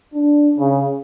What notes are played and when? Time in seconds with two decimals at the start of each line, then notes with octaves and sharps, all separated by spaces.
0.14 D4
0.57 C#3